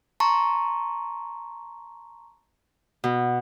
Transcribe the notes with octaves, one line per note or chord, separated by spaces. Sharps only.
A5 A#5 C6 C#6
B2